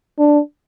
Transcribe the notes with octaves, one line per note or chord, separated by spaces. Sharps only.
D4